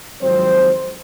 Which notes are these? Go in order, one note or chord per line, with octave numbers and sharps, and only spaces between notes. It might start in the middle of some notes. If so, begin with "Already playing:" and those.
G#1 F2 F#3 C4 C5